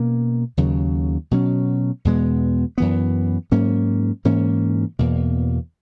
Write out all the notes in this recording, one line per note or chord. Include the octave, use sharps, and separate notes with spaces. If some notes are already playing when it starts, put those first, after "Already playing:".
Already playing: B2 A#3 C#4
D#2 C#3 F#3
B2 F#3 C#4
E2 B2 G#3 B3
F#2 E3 B3
G#2 F#3 A#3 C#4
G#2 E3 A#3 C#4
E2 B2 A#3